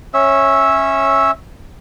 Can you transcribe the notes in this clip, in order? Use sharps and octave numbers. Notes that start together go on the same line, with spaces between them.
C#4 C#5 E5 E6